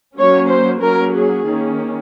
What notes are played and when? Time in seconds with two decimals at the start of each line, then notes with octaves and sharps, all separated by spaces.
0.16 F#3 A#3 C#4 C#5
0.48 C5
0.81 F#3 A#3 C#4 A#4
1.13 G#4
1.45 D#3 A#3 C#4